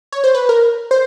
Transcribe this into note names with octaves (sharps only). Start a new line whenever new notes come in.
C#5
C5
B4
A#4
C5